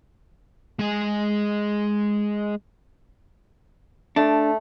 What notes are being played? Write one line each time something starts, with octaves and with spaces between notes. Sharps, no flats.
G#3 G#5
A3 D4